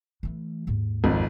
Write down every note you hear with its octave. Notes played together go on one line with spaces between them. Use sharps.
E3 A3
D#2 G#2
G#1 F2